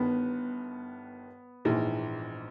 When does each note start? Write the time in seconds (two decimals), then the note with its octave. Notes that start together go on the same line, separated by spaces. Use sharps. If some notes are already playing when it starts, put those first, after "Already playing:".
Already playing: G1 G2 D#3 B3
1.65 A#1 G#2 E3 G#3